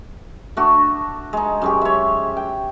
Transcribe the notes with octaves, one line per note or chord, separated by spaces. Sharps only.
A3 D4 F#4
G#3 D#4
F#2 G#3 G4
C#5 E5
G5